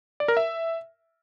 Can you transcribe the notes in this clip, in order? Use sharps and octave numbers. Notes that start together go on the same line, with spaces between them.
D5
A#4
E5